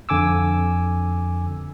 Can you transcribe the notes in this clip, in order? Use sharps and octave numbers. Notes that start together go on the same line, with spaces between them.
F2 D3 G#5 D6 E6